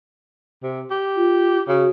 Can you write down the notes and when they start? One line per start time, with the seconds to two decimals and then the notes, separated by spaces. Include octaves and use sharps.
0.63 C3
0.90 G4
1.16 F4
1.68 C#3 F#4